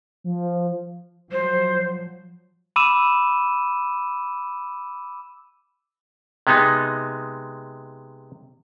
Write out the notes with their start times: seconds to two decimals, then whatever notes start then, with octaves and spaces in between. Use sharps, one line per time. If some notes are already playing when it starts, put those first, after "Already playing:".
0.24 F3
1.32 F3 F#3 C5
2.76 B5 D6 E6 D#7 E7
6.47 C3 G#3 B3 D#4